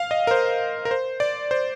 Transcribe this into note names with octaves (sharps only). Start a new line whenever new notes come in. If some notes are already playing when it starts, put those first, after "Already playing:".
Already playing: F5
D#5
A#4
C5
A#4
C5
D5
C5